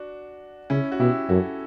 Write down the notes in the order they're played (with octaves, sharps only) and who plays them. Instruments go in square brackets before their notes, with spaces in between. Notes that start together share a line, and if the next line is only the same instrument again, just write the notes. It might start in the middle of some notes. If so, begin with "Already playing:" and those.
Already playing: [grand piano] D4 F#4
[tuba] C#3 [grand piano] C#4 E4
[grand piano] F#4
[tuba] B2 [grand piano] E4 G4
[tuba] F#2 [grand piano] F#4 A4